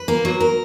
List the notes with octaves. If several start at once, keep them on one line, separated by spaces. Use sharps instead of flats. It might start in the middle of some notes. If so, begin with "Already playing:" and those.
Already playing: B4
A#3
F#3
A#4